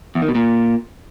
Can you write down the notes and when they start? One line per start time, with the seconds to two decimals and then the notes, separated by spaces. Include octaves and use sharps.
0.15 E2
0.22 D#3
0.28 B2
0.35 A#2